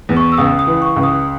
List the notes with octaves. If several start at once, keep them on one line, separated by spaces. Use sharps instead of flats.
E2
C#6
E6
C#2 D#6
D#6
E3
C#6
C#2
D#6